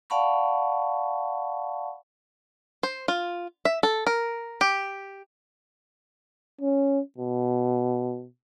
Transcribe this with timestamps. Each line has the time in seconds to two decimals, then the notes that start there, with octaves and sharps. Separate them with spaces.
0.10 D5 F5 F#5 A5 B5 C#6
2.83 C5
3.08 F4
3.65 E5
3.83 A4
4.07 A#4
4.61 G4
6.61 C#4
7.18 B2